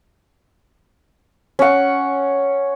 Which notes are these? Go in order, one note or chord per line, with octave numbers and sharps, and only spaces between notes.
C#4 F#5